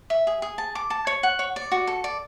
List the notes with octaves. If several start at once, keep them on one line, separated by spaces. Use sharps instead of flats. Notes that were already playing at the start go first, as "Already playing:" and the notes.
E5
G#4
G#4
A5
D6
A5
C#5
F#5
C#5
D5
F#4
A4
D5